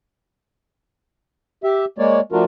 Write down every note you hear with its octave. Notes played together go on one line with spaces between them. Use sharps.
G4 E5
G#3 A#3 C#5 D5
F3 A3 D4 F4 F#4 A#4